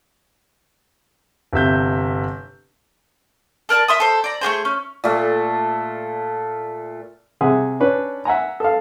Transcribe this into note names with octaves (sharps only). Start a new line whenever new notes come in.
G1 C3 E5 G6
A4 A#4 D5 A5
E5 C6 D#6
A4 C5
D5 A#5
A3 D4 G#4 C5
C#4
A#2 A3
C3 G#4 E5 F#5 G#5
C#4 D4 B4
E5 F#5 G#5 A#5
A4 F5